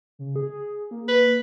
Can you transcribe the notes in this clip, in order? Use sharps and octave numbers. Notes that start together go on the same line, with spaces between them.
C#3
G#4
A#3
B4